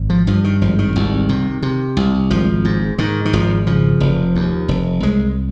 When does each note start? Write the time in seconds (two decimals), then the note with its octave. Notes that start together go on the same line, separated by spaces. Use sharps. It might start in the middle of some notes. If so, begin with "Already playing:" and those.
Already playing: G#1
0.10 F3
0.27 G2 F3
0.44 D#3
0.61 G#1 F3
0.79 D#3
0.96 C2
1.29 C3
1.63 C3
1.97 C2
2.30 G#1 F3
2.65 G#2
2.98 G#2 D#3
3.25 D#3
3.33 G#1 F3
3.67 C#3 F3
4.00 F1
4.35 D#2
4.68 F1
5.03 C2 G#3